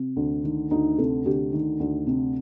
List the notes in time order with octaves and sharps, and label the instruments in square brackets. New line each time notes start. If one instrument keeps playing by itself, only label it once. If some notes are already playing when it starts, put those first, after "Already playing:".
Already playing: [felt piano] C3
D2
D#3
D2 D#4
C3 A4
D2 G4
D#3
D2
C3